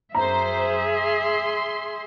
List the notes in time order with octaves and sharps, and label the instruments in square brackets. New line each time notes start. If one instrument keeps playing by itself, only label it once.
[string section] F#2 C5 [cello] G#4 E5 [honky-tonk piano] A#5
[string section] C6